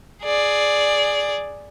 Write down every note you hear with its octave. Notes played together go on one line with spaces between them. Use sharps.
G#4 D5